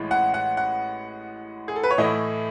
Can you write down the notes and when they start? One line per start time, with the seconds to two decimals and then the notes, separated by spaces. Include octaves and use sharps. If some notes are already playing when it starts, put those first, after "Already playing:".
Already playing: A1 A2 E3 G#3
0.11 F#5
0.34 F#5
0.57 F#5
1.68 G#4
1.76 A4
1.83 B4
1.91 C#5
1.98 A2 E3 A3 E4 D#5